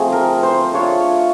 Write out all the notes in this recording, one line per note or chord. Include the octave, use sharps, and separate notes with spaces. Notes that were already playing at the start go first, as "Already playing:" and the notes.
Already playing: F3 A3 C4 G#4
A#4
C5
A3 D4 F4 C#5